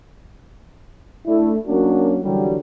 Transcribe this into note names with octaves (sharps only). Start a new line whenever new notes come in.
A3 D4 E4
F#3 A#3 C#4 D4 F#4 A#4
D3 E3 F#3 G3